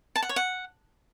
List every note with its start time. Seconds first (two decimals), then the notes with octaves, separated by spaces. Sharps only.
0.16 A5
0.22 F#5
0.29 C#5
0.36 F#5